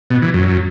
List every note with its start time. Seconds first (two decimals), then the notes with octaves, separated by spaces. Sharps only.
0.10 B2
0.22 E3
0.34 F#2